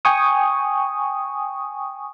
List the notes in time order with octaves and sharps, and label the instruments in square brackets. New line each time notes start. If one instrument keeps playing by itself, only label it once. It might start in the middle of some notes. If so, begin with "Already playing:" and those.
[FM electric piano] G5 G#5 C#6 D#6